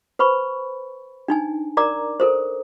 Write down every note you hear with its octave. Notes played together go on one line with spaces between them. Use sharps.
B4 C5 B5 C#6
D4 D#4 G#5
A#4 D5 A#5 D6
A4 A#4 C5